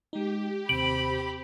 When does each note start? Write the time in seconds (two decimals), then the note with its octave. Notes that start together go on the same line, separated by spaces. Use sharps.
0.13 G#3 D#4 G4
0.69 D#2 C3 C4 B5 D7 F#7